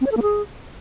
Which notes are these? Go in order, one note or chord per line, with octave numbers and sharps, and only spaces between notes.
C4
C#5
A4
A#3
G#4